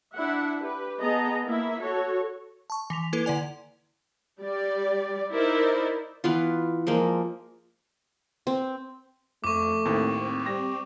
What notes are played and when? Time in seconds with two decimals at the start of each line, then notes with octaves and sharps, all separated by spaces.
0.14 D4 E4 E5 F#5
0.61 G4 B4
1.01 B3 G#4 D#5 A5 A#5
1.46 A#3 E4 E5
1.81 F#4 A4 C#5
2.70 A5 C#6
2.90 E3 B6 F7
3.13 A#3 E4 A4 B4
3.25 D3 E4 D5 G#5 F7
4.40 G3 D5
5.32 D#4 E4 A#4 C5 D5
6.24 E3 B3 F4
6.87 F3 G#3 A#3
8.47 C4
9.44 F2 A3 C#6 D6
9.85 D#2 A2 C4
10.46 G3 A#6